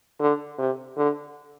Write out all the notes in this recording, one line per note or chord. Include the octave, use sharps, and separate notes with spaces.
D3
C3
D3